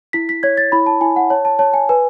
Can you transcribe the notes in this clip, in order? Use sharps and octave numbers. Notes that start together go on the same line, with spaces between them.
E4 B6
B6
C#5 G#6
A6
E4 B5
A5
E4 G#5
F#5
C#5 A5
A5
C#5 A5
G#5
B4 G#5